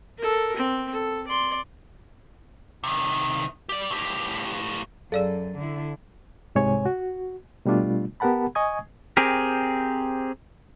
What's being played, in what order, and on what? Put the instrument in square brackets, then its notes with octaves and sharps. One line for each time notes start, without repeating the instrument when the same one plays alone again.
[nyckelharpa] A4 A#4
C4
A4
D5 C6
[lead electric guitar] C3 D#3
G4 D5
A2 G4
[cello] F#2 [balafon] G#4 D5 F5 [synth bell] A4
[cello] D3 E4
[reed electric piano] C2 G#2 C3 G#3 C#5 G#5
F#4
B2 G3 A3 D4 F4
B3 G4 A#4 F#5 A5 B5
D#5 G#5 C#6 D#6 G#6
[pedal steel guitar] C4 G4 G#4 A#4